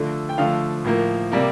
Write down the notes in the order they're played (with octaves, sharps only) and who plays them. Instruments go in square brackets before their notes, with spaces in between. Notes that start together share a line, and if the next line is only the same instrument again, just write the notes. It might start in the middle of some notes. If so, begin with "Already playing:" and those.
Already playing: [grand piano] D3 F3 A3
G5
D3 F3 A3 F5
A2 F3 A#3
C3 G3 A#3